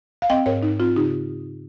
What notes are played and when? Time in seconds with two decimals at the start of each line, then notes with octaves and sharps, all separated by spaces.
0.22 F5
0.30 C4 D#5 G5
0.46 G#2 A#4 C#5
0.63 G#2 D#4
0.79 C4 F4
0.96 C#3 D#4 G4